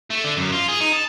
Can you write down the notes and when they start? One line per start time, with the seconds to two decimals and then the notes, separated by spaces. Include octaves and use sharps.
0.10 A3
0.24 D3
0.37 F#2
0.52 F4
0.69 G#4
0.81 D#4
0.93 A5